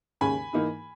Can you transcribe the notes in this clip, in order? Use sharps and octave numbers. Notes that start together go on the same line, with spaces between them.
D#2 C#3 G#3 C#4 G#5 B5
G#2 E3 A#3 D#4